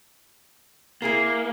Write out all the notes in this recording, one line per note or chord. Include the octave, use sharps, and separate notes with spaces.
A#3 E4 G#4 A#4 C7